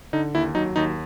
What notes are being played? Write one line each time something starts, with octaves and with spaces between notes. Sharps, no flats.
D3 D#4
D#2 E4
F#3 D#4
D#2 D#4